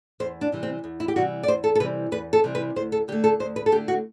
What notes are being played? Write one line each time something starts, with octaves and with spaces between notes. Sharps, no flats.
E2 C5
D4
C3 E3 G3
C4
E2
E4
G4
C3 E3 G3 F#4
D5
E2 C5
A4
A4
C3 E3 G3 B4
E2 B4
A4
C3 E3 G3
B4
D2 C5
A4
D3 A3 G4
A4
D2 C5
B4
A4
D3 A3 G4
F#4